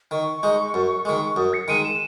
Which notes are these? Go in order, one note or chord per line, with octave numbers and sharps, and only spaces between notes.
D#3 C#6
G#3 D#4
F#2
D#3 G#3
F#2 D#6
C#7
D#3 G#3 D#7
E7